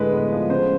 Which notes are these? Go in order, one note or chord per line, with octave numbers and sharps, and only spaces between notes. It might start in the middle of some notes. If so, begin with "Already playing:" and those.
Already playing: A2 D3 G#3 B4
B3
F3
C#3 C5